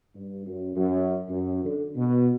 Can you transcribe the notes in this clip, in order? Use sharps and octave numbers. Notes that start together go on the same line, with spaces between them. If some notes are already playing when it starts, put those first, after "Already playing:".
G2
F#2
F#2
F#2
D3
B2